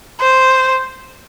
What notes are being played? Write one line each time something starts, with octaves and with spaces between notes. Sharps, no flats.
C5